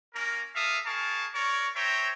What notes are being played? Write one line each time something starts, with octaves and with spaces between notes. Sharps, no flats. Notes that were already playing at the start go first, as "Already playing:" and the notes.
A#3 C#4 A#4
A#3 A4 E5 F5 D#6
G#4 A#4 F5 A5 C#6
A#4 C#5 D5 C#6
C5 C#5 E5 G5 A#5